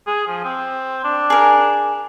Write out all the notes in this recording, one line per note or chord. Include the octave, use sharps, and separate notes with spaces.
G#4
F3
C4
D4
G#4 A#4